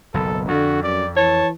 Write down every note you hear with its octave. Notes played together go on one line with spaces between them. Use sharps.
F#1 B1 A4
F2 D3 F#4
F#2 D5
E3 C#5 A5